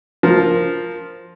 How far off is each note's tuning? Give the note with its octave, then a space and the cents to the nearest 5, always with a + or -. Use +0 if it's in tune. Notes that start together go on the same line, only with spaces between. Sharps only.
F3 +0 A#4 +5